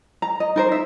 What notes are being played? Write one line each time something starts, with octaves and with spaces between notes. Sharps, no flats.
A#5
D#5
D#4 A#4 C5
E5